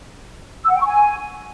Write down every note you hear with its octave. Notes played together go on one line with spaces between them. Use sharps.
E6
F#5
G5
C#6
G#5